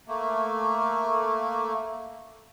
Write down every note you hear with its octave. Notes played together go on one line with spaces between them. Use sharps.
A3 A#3